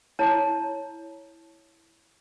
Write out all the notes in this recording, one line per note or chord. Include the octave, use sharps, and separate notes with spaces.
E4 C#5 A5 A#5